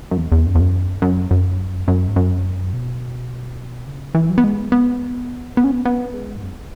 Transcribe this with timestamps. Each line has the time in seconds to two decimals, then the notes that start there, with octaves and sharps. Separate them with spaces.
0.11 F#2
0.17 E2
0.32 E2
0.46 F#2
0.55 E2
0.60 F#2
1.02 F#2
1.31 F#2
1.88 F#2
2.08 G#2
2.16 F#2
2.73 B2
3.87 C#3
4.15 E3
4.30 F#3
4.38 B3
4.44 G#3
4.72 B3
5.57 B3
5.64 C#4
5.71 B3
5.85 B3
6.14 G#3
6.37 G#2
6.42 F#2